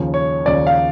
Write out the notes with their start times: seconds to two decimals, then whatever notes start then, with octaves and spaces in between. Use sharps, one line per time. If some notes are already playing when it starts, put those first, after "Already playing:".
Already playing: D#2 C#3 F3
0.14 C#5
0.46 D#2 C#3 F3 D5
0.67 F5